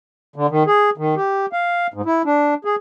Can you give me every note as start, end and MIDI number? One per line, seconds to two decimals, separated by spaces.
0.36 0.47 50
0.50 0.63 51
0.67 0.90 68
0.98 1.15 51
1.16 1.46 67
1.53 1.87 77
1.94 2.01 44
2.05 2.22 64
2.26 2.54 62
2.65 2.76 68